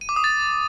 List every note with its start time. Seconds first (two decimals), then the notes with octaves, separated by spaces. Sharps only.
0.01 D#7
0.09 D6
0.16 D#6
0.24 A6